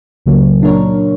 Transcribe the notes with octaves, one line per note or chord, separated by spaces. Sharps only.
C#2 C#3 F#3 A#3
A#2 A#3 D4 A#4 C#5